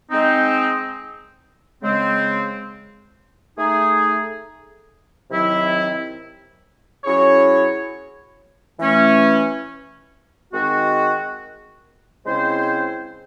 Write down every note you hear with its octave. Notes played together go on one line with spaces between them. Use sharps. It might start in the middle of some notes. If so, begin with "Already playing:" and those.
G#3 C4 D#4
C#3 G#3 C4
A3 D#4 G#4
C3 D#3 F#3 C4 E4
F#3 C#4 E4 G#4 C#5
E3 A3 C#4
D#3 G#3 C4 F#4
C#3 G#3 C4 E4 C5